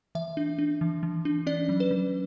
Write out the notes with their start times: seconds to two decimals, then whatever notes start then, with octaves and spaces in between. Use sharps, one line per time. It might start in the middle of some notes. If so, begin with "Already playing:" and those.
0.15 E3 E5
0.37 D4
0.58 D4
0.81 E3
1.03 E3
1.25 D4
1.47 C#4 D5
1.69 F#3
1.80 B4
1.91 F#3